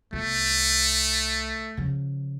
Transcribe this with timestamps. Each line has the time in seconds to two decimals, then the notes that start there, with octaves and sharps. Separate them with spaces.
0.13 C2 A3 B3
1.77 C#3 F3